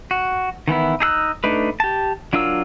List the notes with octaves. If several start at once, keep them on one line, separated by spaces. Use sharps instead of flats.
F#4
D#3 E3 B3 E4
D#4 G#4 E6 F#6
A3 D4 D#4 B4
G4 A5
F#3 D4 F4 A#4 E6